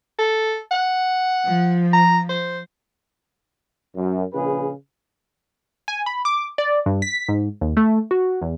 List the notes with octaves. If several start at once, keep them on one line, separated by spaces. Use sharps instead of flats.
A4
F#5
F3
A#5
C5
F#2
A#1 C#3 G#4 B4
G#5
B5
D6
D5
G2
B6
G#2
D#2
A3
F#4
E2